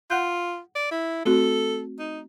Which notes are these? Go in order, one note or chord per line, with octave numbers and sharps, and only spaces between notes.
F4 F#5 F#6 G6
D5
E4
A3 C4 F#4 A4
D#4